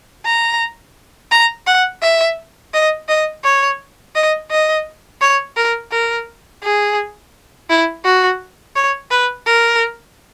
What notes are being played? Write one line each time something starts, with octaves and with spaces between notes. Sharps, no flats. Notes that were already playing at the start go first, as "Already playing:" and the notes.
A#5
A#5
F#5
E5
D#5
D#5
C#5
D#5
D#5
C#5
A#4
A#4
G#4
E4
F#4
C#5
B4
A#4